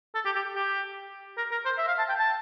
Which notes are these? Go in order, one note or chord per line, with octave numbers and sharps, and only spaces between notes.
A4
G4
G4
G4
A#4
A#4
C5
E5
F5
A5
G5
A5